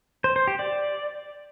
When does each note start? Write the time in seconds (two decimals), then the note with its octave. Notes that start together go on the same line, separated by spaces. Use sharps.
0.24 C5
0.36 C5
0.48 G4
0.59 D5